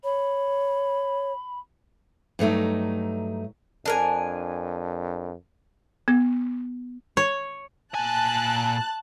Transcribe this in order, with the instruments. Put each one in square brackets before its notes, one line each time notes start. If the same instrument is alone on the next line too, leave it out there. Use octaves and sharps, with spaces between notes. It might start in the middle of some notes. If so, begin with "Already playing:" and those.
[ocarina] C#5 [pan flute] B5
[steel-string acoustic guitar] G2 F#3 A3 D#4
[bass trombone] F2 [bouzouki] D4 A#4 G#5
[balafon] B3
[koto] C#5
[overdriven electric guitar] A#2 G#5 [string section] A5 F#6